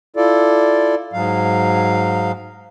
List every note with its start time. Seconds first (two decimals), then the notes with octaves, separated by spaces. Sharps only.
0.16 E4 F4 A4 D5
1.13 G#2 F#3 F5